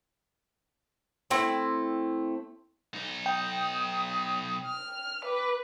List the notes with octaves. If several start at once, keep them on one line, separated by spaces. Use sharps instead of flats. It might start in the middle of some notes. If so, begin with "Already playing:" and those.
A3 C4 E4
B1 D#4
G5 D#6
F6
B4 D6